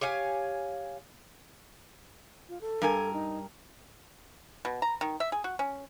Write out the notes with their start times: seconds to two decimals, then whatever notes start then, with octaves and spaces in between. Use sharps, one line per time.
0.01 G4 C#5 F5 G#5
2.49 F4
2.61 A4
2.82 G2 A#4 G#5
3.13 D#4
4.65 B2
4.82 A#5
5.01 D#3
5.20 E5
5.32 G#4
5.44 F#4
5.59 C#4